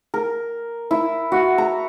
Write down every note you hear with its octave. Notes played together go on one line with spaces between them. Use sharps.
A#4
E4
F#4
A#5